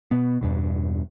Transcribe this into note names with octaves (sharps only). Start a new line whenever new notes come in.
B2 B3
E2 G2 B2